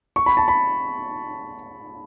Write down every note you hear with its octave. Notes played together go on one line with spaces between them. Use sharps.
C#6
B5
A5
B5